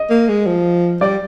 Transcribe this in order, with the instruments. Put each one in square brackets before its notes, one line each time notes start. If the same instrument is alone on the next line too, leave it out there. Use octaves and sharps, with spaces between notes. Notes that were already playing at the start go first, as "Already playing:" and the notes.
Already playing: [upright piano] D#5
[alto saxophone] A#3
G#3
F3
[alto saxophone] G3 [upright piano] D5